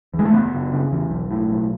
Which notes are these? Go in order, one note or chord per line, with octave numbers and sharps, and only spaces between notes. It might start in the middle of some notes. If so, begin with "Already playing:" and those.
E2
G#3
A3
F#1 B3
F#1
C#3
E2
B1
A2
B1